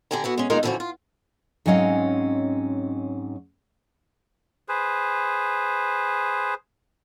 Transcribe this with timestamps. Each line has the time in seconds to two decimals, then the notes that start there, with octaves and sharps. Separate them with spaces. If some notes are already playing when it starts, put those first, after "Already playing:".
0.11 D3 G4 D5 G#5 A#5
0.24 B3 E4 F#4
0.38 G#3 C#4
0.50 D#3 G#3 A#3 D#4 F4 A#4
0.63 F2 D3 E3 F3 C#4 F#4
0.80 F4
1.66 G#2 F#3 C4 C#4 D#5 F5
4.68 G#4 B4 C5